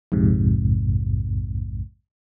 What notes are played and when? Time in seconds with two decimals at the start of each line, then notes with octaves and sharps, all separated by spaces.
0.12 A#1 F2 G#2 C3